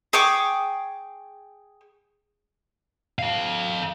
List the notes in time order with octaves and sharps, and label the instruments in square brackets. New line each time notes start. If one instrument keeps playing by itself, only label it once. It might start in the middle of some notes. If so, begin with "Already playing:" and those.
[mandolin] G#4 G5 C#6 D6
[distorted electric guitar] A4 F5